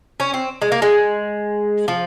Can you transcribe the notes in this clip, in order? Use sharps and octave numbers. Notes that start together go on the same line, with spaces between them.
C#4
C4
G#3
A#3
G#3
F3